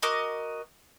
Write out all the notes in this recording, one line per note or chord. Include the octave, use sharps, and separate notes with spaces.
F#4 A#4 D#5 D6